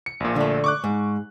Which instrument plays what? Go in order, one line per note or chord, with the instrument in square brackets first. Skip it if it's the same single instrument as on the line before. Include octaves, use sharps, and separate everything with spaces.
[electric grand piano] C#7
A#1 A#2
[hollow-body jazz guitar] D3 A3
[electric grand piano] C#6 D6 F#6
[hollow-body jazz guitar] G#2